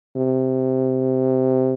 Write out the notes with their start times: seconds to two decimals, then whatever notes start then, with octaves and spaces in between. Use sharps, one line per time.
0.16 C3